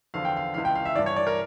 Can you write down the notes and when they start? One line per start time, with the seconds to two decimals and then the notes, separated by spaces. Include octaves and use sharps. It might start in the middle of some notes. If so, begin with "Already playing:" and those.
0.14 E2 D3 F3 F5
0.25 G5
0.37 F5
0.54 C#2 C#3 E3 F5
0.65 G5
0.75 F5
0.85 E5
0.96 G2 E3 D5
1.06 C#5
1.16 D5
1.27 A#4